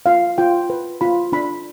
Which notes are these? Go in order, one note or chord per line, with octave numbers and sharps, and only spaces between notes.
F4 F5
F4 G5
B4
F4 B5
D4 B5